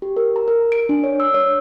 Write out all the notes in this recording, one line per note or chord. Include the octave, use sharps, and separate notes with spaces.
G4
A#4
A#5
A#4
D7
D4
C#5
E6
C#5